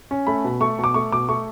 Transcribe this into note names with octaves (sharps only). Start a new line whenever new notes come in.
C#4
A3 B5
B2
A3 C#6
B2 D6
A3 C#6
B2 D6
A3 C#6